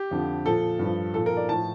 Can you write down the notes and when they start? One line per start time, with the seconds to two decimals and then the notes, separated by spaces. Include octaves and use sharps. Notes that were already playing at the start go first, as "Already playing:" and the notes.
Already playing: G4
0.11 F2 D3 F3
0.45 A#2 F3 A4
0.79 G2
0.84 F3
1.14 A#2 F3 A4
1.26 A#4
1.37 D5
1.49 A2 F3 A5